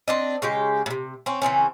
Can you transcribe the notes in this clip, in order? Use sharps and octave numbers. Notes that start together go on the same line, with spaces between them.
C4 D4 D#5
C#3 G#3 G4
A2 C3
C4 C#4
C#3 E3 C4 C#4